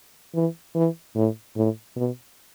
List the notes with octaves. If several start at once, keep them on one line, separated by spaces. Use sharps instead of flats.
E3
E3
A2
A2
B2